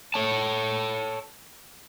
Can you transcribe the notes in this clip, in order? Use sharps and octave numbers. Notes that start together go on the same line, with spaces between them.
A4 C#5 A5